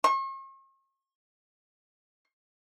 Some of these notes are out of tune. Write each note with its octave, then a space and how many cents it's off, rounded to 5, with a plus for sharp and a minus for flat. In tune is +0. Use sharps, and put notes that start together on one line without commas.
C#6 -45